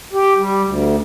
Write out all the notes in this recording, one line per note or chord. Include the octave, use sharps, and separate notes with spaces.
G4
G3
D2